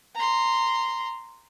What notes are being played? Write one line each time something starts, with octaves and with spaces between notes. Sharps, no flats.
A#5 C6